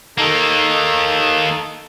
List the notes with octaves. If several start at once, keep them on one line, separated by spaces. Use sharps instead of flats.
D#3 A#3 D#4 A4